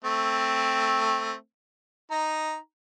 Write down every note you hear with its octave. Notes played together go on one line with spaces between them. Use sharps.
A3 C4
D#4 A#5